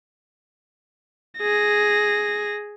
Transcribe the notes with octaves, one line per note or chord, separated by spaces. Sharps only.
G#4 A#6